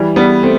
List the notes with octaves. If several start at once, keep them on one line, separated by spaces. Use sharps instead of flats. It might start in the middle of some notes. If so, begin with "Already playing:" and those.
Already playing: E3 G3
G3 B3
A3 C4